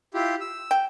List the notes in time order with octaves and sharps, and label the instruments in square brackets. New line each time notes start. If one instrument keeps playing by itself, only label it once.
[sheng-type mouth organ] E4 F4 G4
E6
[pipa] G5